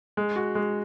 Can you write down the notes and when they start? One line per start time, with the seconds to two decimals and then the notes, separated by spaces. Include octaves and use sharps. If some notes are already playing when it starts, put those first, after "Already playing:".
0.17 G#3
0.36 F#4
0.55 G#3